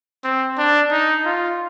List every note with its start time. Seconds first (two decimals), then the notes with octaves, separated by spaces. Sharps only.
0.24 C4
0.58 D4
0.91 D#4
1.25 F4